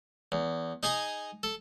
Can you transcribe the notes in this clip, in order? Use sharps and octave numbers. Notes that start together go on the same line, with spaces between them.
E2
D#4 G#4 G#5 A#5
A4